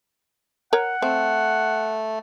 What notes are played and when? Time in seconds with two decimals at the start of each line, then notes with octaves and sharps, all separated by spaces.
0.73 A#4 C#5 F#5 A#5
1.02 A3 C4